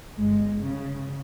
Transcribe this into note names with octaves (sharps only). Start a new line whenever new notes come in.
G1 G#3
C#3